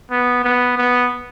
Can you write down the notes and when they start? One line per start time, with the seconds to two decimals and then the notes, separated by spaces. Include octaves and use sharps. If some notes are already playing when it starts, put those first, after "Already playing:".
0.11 B3
0.44 B3
0.78 B3